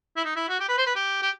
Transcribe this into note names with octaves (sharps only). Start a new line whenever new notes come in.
E4
D#4
E4
F#4
G4
B4
C5
B4
G4
G4